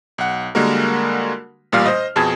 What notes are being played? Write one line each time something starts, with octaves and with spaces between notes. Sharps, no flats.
B1 F#5
D3 G3 G#3 A#3 F#4 A#4
A1 A#2 G3 F5 F6
C5 D#5
F2 B2 G#4 A5 G#6